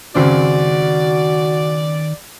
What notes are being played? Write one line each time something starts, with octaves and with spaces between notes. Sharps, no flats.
C#2 F#2 D#3 C4 F#4 D5